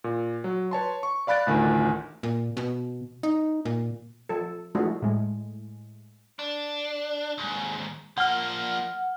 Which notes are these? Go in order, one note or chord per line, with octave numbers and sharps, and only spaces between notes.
A#2
F#3
B4 C#5 A5 C6
C#6
D5 F5 B5 F#6 A6 D7
A1 D2 D#3 F4
A#2
B2
D#4
A#2
F3 A4
F3 G#3 A3 D4 E4 F#4
A2 G#3
D4
D#2 G#2
F3 A#3 F#5 F6